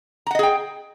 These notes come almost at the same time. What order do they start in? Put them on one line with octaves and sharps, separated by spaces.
A#5 F#5 D#5 G#4 G5